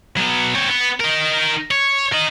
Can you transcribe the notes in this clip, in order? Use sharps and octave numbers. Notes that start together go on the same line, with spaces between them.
F#3 B3
C4 C#5
B3
D#4 A#4
C#5
A#4 D#5